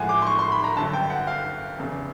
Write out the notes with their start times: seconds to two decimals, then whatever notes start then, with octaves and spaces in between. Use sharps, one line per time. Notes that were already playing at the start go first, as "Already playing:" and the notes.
Already playing: A1 A2 F3 G#3 F#5 G#5
0.09 D6
0.22 C6
0.27 C#6
0.39 C6
0.52 B5
0.64 A#5
0.76 G1 F#2 D3 A5
0.93 G5
1.10 F#5
1.27 F5
1.77 F1 E2 C#3